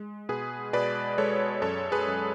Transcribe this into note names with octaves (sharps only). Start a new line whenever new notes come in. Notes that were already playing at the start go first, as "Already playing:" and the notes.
Already playing: G#3
B2 G#4 B4
B2 B4 D5
G#3 A4 C#5
F#2 A4 C#5
G#4 B4
F#2